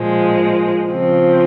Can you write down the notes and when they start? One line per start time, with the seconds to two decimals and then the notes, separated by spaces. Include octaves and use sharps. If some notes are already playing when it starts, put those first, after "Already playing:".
Already playing: A#2 F3 G#3
0.90 C#3 F3 C4